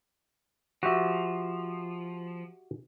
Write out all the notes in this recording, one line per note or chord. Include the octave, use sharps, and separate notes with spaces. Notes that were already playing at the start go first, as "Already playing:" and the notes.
F3 F#4 G4 E5